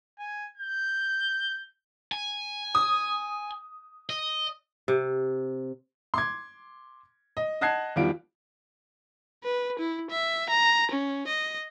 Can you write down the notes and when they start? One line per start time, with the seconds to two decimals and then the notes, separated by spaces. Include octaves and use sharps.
0.19 G#5
0.57 G6
2.12 G#5
2.75 D#6
4.10 D#5
4.88 C3
6.14 C6 D6 G#6
7.37 D#5
7.61 D#5 F#5 A5 F#6 G#6 C7
7.96 E2 D#3 F3 G3 F4 D7
9.44 B4
9.79 E4
10.11 E5
10.50 A#5
10.91 C#4
11.27 D#5